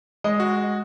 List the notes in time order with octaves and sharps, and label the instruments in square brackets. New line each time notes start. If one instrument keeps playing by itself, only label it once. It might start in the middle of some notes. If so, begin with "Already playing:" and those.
[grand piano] G#3 [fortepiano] D#5
[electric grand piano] F#4